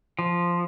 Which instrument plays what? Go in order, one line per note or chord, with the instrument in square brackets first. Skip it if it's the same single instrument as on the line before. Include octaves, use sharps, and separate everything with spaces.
[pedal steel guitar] F3